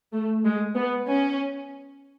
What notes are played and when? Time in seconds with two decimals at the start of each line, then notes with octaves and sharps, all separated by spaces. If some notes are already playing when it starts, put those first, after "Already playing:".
0.13 A3
0.44 G#3
0.76 B3
1.08 C#4